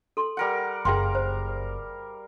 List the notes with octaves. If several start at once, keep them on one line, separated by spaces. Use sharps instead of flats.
A4 C6
G3 A#4 F#5
F#1 G#4 A#4 F5 G5 A#5 C6
C5